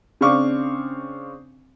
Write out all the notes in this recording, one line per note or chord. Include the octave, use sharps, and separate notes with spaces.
C#3 C4 D4 F5 C#6 D6